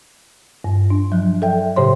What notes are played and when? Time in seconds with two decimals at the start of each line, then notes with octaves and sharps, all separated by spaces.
0.64 G2
0.90 D4
1.12 F3 F#3
1.42 A4 D5 E5 G5
1.76 A2 C#3 G4 C5 C#5 C6